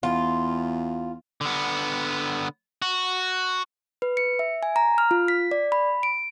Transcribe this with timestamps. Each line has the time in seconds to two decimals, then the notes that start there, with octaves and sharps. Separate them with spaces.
0.03 E2 F4
1.41 D3 B3
2.82 F#4
4.02 B4
4.17 C#7
4.39 E5
4.63 G#5
4.76 A#5
4.98 F6
5.11 F4
5.28 B6
5.51 D5
5.72 B5
6.03 D7